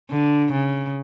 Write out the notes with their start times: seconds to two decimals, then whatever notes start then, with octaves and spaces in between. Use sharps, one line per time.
0.10 D3
0.52 C#3